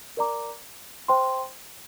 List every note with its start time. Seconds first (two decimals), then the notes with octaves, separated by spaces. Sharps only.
0.17 A#4 D5 A#5 D6
1.08 C5 G5 C6